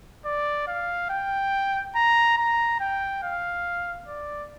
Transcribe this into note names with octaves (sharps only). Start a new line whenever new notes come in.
D5
F5
G5
A#5
A#5
G5
F5
D5